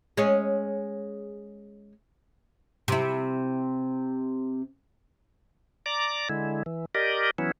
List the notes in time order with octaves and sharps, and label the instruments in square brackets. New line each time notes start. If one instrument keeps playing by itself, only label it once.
[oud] G#3 C#4
C3 E4
[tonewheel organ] D5 A#5 D6
D3 G#3 E4
E3
G4 A#4 D5 D#5
E3 F#3 B3 C#4 E4